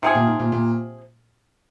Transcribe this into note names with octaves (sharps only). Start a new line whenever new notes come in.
G#2 C3 F3 C4 G#4
A#2
G#2
A#2
A#2